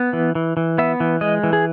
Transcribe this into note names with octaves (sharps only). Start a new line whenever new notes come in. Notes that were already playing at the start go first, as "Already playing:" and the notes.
Already playing: B3
E3
E3
E3
B3 E5
E3
G#3 D#5
E3
G#4